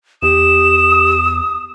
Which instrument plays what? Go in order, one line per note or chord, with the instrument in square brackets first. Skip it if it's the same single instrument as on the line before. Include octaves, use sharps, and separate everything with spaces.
[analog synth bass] E2 [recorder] G4 [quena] D#6 [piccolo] E7